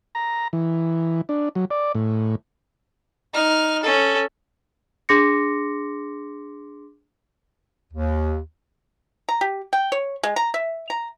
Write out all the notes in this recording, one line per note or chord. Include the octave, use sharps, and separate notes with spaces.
A#5
E3
D4
F#3
D5
A2
D#4 F6
C#4 A4
D4 G#4 C6 D6 A#6 C#7
D#2
A#5
G4
G5
C#5
G#3
A#5
E5
A#5